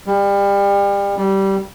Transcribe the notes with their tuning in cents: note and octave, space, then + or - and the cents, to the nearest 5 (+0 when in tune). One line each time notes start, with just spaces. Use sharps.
G3 +30
G3 -15